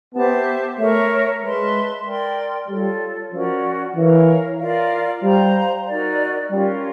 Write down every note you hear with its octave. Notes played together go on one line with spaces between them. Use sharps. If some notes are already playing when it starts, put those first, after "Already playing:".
B3 G4 C5 E5 A5
A3 A#4 C#5 E5
G#3 B4 E5 A5 C6
A#4 D5 G5 C6
G3 F4 A4 C#5
F3 C#4 F#4 A#4 D5
E3 A#4 C#5 F5
F4 A#4 D5 F5
G3 C5 F5 A#5
D#4 F#4 A#4 D5
G3 C#4 F4 A#4